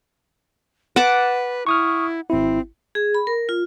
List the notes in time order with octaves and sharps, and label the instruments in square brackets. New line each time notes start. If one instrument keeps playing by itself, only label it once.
[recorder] B4 [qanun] F#5 A5 D6
[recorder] E4 [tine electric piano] C#6 D#6 F6
[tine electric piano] G#1 E4 [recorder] C4
[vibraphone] G#4
B5
A#4
F4